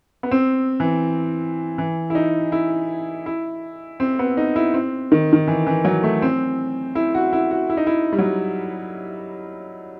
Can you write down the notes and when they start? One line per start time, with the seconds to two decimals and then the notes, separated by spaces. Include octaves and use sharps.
0.23 B3
0.31 C4
0.80 E3
1.78 E3
2.10 E4
2.15 D#4
2.52 E4
3.26 E4
4.00 C4
4.19 B3
4.37 D#4
4.56 E4
4.74 C4
5.12 D#3
5.33 D#3
5.47 E3
5.66 E3
5.85 F#3
6.03 A3
6.22 C4
6.95 E4
7.15 F#4
7.33 E4
7.51 F#4
7.70 E4
7.77 D#4
7.87 E4
8.13 G3
8.19 F#3